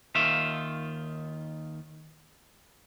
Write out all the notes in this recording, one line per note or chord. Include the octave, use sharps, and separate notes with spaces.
D#2 D#3 F4 E5